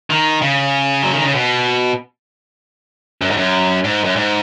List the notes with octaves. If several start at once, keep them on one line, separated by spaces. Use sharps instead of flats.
D#3
C#3
F#3
D#3
C#3
B2
F#2
G#2
F#2
G#2
F#2
G#2